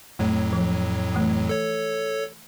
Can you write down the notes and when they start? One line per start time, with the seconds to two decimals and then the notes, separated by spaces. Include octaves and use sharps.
0.19 F2 A2 F#3 A3
0.53 F3
1.14 E3 A3
1.49 A4 C#5